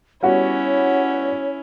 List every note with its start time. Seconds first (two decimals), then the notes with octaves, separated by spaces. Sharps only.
0.23 G3 B3 C#4 E4 F#4 C#5